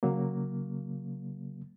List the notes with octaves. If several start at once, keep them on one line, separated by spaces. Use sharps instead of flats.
C#3 F#3 A#3